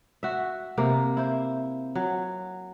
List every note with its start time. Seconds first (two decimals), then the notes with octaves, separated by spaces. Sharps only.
0.23 F#4 E5
0.78 C3 A#3
1.17 E4 C5
1.95 F#3